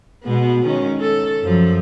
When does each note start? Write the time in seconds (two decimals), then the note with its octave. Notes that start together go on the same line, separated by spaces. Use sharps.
0.24 B2 G#3 B3
0.66 D#3 C#4
1.00 A4
1.43 F#2 F3